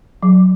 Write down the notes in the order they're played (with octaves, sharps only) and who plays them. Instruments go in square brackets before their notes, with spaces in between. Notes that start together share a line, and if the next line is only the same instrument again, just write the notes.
[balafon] F#3